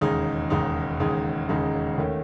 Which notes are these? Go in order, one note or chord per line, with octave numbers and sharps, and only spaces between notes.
E1 D#2 C#3 G#3 D#4
E1 D#2 C#3 G#3 D#4
E1 D#2 C#3 G#3 D#4
E1 D#2 C#3 G#3 D#4
D#2 D#3 A3 C#4